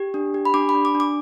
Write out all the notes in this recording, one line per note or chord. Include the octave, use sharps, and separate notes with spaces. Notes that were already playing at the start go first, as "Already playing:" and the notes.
Already playing: G4
D4
G4
B5
D4 D6
B5
D4
D6
D4
D6